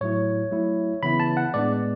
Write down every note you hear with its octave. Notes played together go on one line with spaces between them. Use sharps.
A2 F#3 A3 E4 C#5
F#3 A3 E4
C#3 E3 B3 E4 B5
A5
F#5
A2 G#3 B3 D4 D5